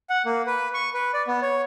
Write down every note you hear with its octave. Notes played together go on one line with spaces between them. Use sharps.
F#5
A#3
B4
C#6
B4
D5
B3
C#5